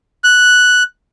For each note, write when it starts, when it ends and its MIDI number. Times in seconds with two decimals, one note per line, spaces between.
0.24 0.83 90